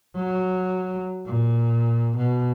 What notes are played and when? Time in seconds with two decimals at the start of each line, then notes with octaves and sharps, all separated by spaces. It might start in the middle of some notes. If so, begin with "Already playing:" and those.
0.16 F#3
1.26 A#2
2.17 B2